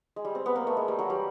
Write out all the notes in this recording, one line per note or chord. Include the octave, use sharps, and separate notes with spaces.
G#3
G3
C4
B3
A#3
A3
G#3
G3
F#3
G3